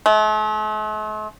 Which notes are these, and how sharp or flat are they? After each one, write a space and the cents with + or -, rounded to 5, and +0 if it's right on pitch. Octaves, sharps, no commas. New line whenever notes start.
A3 -45